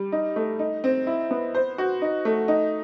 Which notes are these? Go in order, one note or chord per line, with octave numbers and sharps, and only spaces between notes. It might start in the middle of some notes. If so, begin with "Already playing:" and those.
Already playing: G3
D#4
A3
D#4
C4
E4
B3
C5
F#4
D#4
A3
D#4